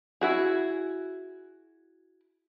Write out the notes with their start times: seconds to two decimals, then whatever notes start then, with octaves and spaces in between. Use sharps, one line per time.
0.21 E4 F#4 G#4